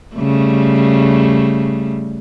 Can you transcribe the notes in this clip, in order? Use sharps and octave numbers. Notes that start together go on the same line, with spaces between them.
C#3 G3 A3